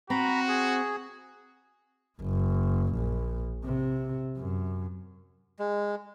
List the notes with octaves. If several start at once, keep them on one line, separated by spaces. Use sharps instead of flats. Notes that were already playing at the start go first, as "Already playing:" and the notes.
C4 F#4 A#5 B5
G#4
F#1
A#1
C3
F#2
G#3